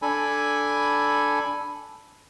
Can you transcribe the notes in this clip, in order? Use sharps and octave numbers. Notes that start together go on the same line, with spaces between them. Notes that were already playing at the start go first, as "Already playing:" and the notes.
D4 A4 G#5 B5